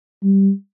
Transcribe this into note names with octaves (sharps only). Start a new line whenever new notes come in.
G3